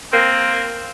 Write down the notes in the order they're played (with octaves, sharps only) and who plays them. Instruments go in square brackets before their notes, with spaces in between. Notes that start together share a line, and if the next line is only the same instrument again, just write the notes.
[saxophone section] A#3 C4